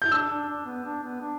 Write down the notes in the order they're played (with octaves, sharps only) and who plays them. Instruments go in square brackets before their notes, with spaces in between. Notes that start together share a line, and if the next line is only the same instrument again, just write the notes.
[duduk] E4 [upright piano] G6
[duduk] D4 [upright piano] E6
[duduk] D4
D4
B3
D4
B3
D4